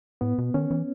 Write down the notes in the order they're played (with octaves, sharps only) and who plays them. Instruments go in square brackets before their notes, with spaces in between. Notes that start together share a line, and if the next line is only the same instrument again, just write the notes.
[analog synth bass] A2 [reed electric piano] B3
[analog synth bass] B2
[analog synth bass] D#3 [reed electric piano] C#4
[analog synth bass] E3